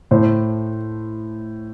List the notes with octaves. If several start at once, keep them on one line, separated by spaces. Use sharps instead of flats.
A2 C5